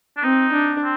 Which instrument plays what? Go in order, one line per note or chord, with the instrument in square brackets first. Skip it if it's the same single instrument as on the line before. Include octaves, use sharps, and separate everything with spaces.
[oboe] D4
[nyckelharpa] C4 [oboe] D#4
[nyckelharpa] D4
[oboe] C4